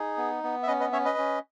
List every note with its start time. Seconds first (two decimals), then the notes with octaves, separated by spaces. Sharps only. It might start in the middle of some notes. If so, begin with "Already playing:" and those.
Already playing: D#4 G#4
0.17 B3
0.43 B3
0.63 E5
0.67 C#4 B4 D#5
0.80 B4 D#5
0.92 C#4 C#5 E5
1.05 B4 D#5
1.18 C#4